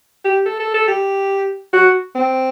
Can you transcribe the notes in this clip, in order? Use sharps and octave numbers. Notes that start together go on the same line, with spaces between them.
G4
A4
A4
A4
G4
F#4
C4